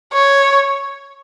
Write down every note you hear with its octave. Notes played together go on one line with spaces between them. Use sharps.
C#5